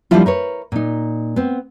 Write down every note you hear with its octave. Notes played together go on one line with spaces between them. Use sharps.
F3 G3 A#3 D4 E4 F4
A#4 B4 C#5
A#2 D#4
B3 C4